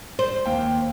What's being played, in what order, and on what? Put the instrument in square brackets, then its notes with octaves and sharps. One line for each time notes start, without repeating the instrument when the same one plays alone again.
[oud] C5
[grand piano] D#2 F5 G5